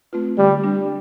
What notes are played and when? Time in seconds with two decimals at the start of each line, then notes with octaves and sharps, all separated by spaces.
0.13 A3 C4 F4 B4
0.38 D3 G3
0.64 G3 D4